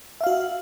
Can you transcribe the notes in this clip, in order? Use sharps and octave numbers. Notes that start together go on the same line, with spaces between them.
F#4 E5 F5